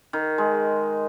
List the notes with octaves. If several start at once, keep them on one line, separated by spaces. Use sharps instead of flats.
D#3
G#3